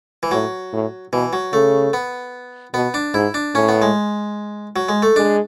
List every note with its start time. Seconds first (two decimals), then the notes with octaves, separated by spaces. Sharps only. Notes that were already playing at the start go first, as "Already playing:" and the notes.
0.23 E3
0.31 A2 F#3
0.73 A2
1.13 B2 E3
1.33 F#3
1.52 C#3 A3
1.93 B3
2.74 B2 B3
2.94 D4
3.14 G#2 E4
3.34 D4
3.54 A2 C#4
3.69 B3
3.82 G#3
4.76 F#3
4.89 G#3
5.02 A3
5.16 G#3 D4